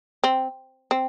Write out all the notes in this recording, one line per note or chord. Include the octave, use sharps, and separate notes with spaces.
C4
C4